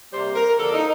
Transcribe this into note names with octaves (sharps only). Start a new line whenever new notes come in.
C3 G3 A#3 C5
A#4
D3 F3 A#3 A4
D#4